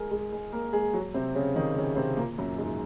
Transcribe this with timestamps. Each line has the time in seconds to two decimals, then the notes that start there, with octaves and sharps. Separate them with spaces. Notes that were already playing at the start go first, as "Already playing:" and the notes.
Already playing: G#3 G#4 A#4
0.11 G#3 G#4
0.32 G#3 G#4
0.53 A#3 A#4
0.73 G#3 G#4
0.93 F#3 F#4
1.14 C3 C4
1.35 C#3 C#4
1.56 D#3 D#4
1.76 C#3 C#4
1.96 C3 C4
2.17 A#2 A#3
2.38 F#2 F#3
2.58 G#2 G#3